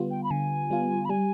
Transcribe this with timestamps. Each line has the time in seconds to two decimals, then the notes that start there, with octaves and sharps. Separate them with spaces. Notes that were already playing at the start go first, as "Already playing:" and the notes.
Already playing: D3 G3 B3 F4
0.11 G5
0.24 B5
0.30 D3 G#5
0.70 G3 B3 F4
1.05 B5
1.09 G3 G#5